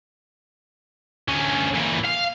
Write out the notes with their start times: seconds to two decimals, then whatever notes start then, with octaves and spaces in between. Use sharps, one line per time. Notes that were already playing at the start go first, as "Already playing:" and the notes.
1.28 D2 C#4
1.74 A#2 E3
2.05 F5